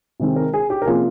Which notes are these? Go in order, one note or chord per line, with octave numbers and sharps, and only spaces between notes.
C3 D#3 G#3 C4
A#4
G#4
G4
A#4
C3 F3 A#3 C#4 F4 G#4